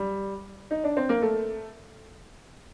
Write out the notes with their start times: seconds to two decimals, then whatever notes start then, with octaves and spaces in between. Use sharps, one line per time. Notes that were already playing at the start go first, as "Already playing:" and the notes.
Already playing: G3
0.71 D#4
0.84 D4
0.97 C4
1.09 A#3
1.22 A3